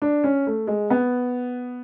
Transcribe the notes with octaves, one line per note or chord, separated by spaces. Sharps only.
D4
C#4
A3
G#3
B3